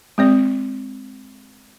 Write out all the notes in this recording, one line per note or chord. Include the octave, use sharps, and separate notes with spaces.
G#3 C4 D5